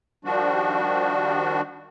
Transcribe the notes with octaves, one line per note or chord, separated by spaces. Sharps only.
D#3 F3 G3 D4 F#4